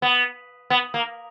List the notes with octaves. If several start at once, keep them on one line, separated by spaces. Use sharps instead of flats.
B3
B3
A#3